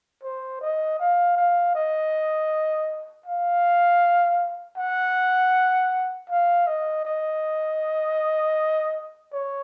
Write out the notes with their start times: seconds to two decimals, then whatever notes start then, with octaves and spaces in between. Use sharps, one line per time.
0.23 C5
0.61 D#5
0.99 F5
1.36 F5
1.75 D#5
3.26 F5
4.77 F#5
6.30 F5
6.67 D#5
7.05 D#5
9.33 C#5